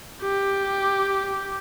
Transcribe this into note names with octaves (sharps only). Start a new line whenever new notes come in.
G4